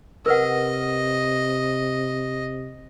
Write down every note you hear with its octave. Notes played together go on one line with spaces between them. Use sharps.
C3 A#4 B4 D#5 F#5